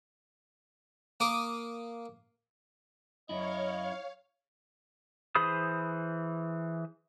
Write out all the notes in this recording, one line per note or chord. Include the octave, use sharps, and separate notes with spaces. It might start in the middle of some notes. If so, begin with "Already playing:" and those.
A#3 D6 D#6
F#2 E4 C#5 D#5 F5
E3 G#4 C5 B5 D#6